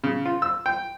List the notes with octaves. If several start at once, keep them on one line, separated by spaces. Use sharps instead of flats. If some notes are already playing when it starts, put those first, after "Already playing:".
C#3
F4
E6
G5